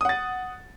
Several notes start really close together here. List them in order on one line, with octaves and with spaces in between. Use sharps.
D#6 F#5 A6